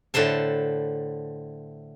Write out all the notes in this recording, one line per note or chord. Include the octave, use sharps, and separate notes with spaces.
A2 D3 B4 C5 A5